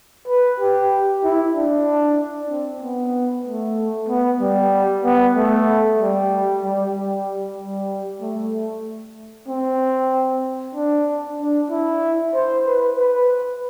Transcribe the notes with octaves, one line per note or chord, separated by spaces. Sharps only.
B4
G4
E4
D4
C4
B3
A3
B3
G3
B3
A3
G3
G3
G3
G3
A3
C4
D4
D4
E4
C5
B4
B4